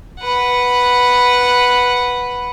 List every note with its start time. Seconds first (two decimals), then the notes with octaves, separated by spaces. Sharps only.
0.20 B4 F#5